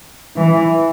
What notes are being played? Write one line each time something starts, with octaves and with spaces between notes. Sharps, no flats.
E3